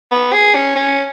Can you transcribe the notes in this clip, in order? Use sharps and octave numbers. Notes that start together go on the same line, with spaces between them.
B3
G#4
C#4
C#4